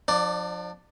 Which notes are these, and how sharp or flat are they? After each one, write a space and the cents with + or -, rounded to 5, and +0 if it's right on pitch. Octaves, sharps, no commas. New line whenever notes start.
F3 +25 D4 +40 D5 +0